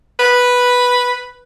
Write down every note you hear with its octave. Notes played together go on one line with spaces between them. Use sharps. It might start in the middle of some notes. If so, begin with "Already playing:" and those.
B4